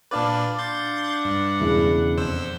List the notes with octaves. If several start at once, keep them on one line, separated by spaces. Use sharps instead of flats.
A#2 D4 B4 D5 F5 A5
D4 F#5 C6 G6 A6
G2
E1 C#3 E4
F2 C5 E6